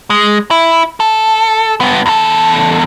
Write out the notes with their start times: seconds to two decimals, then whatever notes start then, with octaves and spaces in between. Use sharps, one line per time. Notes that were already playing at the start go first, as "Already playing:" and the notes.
0.10 G#3
0.51 E4
1.00 A4
1.81 G2 B3
2.06 E2 A4